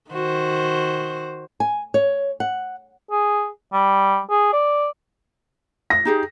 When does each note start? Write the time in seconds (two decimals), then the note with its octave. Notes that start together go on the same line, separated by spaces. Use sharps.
0.10 D#3 F#4 C5
1.60 G#5
1.94 C#5
2.40 F#5
3.11 G#4
3.73 G3
4.30 G#4
4.53 D5
5.90 A#6
6.05 D#4 G4 G#4